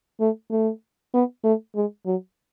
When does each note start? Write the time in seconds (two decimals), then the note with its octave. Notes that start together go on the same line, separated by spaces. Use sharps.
0.20 A3
0.51 A3
1.14 B3
1.44 A3
1.75 G#3
2.06 F#3